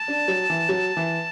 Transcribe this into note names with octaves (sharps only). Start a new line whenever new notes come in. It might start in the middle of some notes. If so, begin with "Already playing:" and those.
Already playing: A5
D4
F#3
E3
F#3
E3